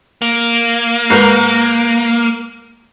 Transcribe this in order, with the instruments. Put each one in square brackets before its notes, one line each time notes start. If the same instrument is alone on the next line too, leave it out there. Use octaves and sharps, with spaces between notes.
[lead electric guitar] A#3
[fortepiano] G#2 A#4 B4